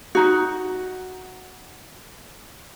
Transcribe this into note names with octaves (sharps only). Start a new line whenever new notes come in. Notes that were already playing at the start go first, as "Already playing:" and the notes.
D#4 F#4